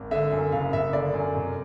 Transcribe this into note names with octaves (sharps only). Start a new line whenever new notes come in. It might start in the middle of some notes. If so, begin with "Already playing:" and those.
Already playing: G#1
D3 E5
F#2
F#1 F5
F#1 E5
D3 D5
F#2
F1